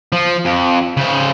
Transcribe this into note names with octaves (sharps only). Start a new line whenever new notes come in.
F3
F2
C#3 C5